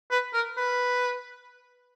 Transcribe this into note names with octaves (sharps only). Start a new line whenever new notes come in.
B4
A#4
B4